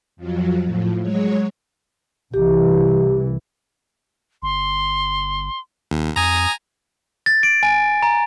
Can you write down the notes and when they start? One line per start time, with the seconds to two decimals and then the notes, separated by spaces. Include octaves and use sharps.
0.16 F2 F3 F#3
0.63 A2 F3
1.01 F#3 G#3 C#5
2.34 C2 E3 G4
4.42 G1 C6
5.91 D#2
6.16 F2 G#5 A#5 D#6
7.26 A6
7.43 D7
7.63 G#5
8.03 A#5